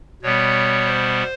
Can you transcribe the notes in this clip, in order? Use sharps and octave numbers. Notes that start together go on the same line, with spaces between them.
B2 G3 B3 C#5
C5